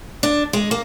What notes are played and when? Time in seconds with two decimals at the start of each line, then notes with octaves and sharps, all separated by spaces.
0.23 D4
0.53 G#3
0.71 A#3